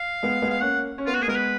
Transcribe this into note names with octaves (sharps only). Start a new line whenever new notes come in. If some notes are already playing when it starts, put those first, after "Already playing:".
Already playing: F5
G#3 B3
G#3 B3
F5
A#3 C#4 F#5
C#4
B3 F4
F#4
A#3 G#4
G#3 B3 A#4
B4